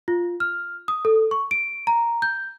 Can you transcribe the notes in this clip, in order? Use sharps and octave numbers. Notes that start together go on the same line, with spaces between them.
F4
F6
D#6
A4
C#6
D7
A#5
G6